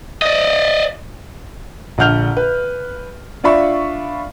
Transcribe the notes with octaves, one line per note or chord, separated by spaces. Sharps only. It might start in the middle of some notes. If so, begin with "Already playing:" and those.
D5 D#5
A#1 D3 F#5 F6 G6 F7
B4
D4 F4 D5 E5 B5 C#6